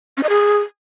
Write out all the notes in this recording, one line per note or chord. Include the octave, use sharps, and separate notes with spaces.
C#4
D#5
G#4